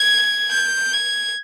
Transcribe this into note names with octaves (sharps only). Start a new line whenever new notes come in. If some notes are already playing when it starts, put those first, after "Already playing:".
Already playing: G#6
G6
G#6